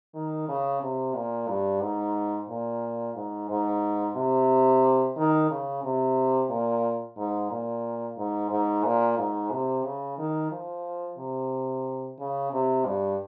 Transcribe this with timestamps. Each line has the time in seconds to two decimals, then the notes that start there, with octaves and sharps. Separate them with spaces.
0.15 D#3
0.49 C#3
0.82 C3
1.15 A#2
1.49 G2
1.81 G#2
2.49 A#2
3.16 G#2
3.50 G#2
4.16 C3
5.17 D#3
5.50 C#3
5.84 C3
6.50 A#2
7.18 G#2
7.51 A#2
8.18 G#2
8.51 G#2
8.85 A#2
9.19 G#2
9.52 C3
9.85 C#3
10.18 D#3
10.52 F3
11.18 C3
12.19 C#3
12.53 C3
12.86 G2